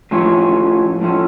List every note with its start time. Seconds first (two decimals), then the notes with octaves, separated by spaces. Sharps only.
0.11 A2 F3 A3 C#4
1.01 A2 F3 A3 C#4